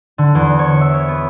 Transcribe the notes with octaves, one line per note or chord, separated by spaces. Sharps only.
D3
E2
C#5
E5
C#5
B3